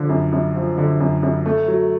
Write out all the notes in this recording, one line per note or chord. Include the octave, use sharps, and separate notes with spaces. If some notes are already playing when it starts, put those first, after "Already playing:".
Already playing: D3 F3
F#2
F#2
F3
D3
F#2
F#2
A3
F#3